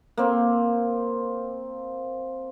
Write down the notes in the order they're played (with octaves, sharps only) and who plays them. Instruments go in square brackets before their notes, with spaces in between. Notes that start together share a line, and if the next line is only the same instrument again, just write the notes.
[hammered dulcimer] A#3 C4